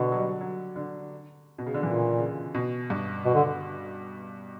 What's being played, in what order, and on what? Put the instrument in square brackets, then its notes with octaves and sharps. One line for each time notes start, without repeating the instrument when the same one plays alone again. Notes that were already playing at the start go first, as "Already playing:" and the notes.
Already playing: [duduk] B2 [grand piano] D3
[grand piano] F#3
G3
F#3
D3
B2
C#3
D3
[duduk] A#2 [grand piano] E3
[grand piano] C#3
B2
G2
[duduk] B2
D3